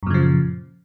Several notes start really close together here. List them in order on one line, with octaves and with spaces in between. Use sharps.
F#2 A#2 C#3 F3